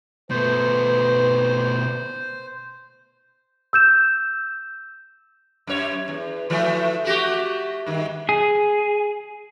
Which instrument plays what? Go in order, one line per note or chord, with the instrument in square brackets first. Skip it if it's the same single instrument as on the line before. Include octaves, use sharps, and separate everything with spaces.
[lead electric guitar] B2 A3 [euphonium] B4 [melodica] C5
[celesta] E6 G6 E7
[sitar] F#2 C#5
E2
E3 F3 A3
A3 F#4 G4
G2 D#3
[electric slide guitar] G#4